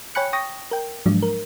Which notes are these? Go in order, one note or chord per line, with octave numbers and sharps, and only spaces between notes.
C#5 G5 G#5 B5 F#6 C#7
G5 C#6 D#6 A#6
A#4 G5
G#2 F3 F#3 G#3 D4
A#4